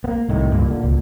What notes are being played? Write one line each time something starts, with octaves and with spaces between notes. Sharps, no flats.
A#3 B3
C2 A2 D#3
C#2 G2 A#2
A#2 D3
C#2 A#2